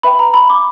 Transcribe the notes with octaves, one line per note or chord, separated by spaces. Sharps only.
B4 E5 G5 B5
A#5
B5
D6